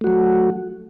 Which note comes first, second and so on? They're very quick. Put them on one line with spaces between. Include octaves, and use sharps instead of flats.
A3 F#4 F#3